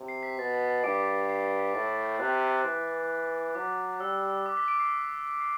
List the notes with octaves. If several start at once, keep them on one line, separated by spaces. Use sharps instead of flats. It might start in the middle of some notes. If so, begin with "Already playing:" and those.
Already playing: C3
C7
B6
B2 A6
G2 D6 D7
C7
B6
B6
A2 A6
A6
G6
C3 F#6
E3
F#3 D6
G3 E6
D6
B6
D6 D7
C7
C7